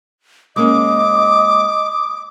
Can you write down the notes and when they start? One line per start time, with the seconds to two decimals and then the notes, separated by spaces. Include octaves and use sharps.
0.56 G#3 A#3 C#4 D#5 D6 D#6